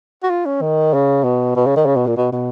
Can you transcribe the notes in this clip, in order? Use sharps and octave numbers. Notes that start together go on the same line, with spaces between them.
F#4
F4
C#4
D#3
C#3
B2
B2
C#3
D#3
C#3
B2
A#2
B2
B2